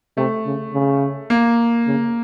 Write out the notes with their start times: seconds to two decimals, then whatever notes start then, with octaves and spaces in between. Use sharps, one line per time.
0.17 C3 A3
0.46 C#3
0.73 C#3
1.30 A#3
1.87 C#3